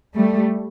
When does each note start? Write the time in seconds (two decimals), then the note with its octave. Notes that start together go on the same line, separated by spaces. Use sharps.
0.15 G3 A3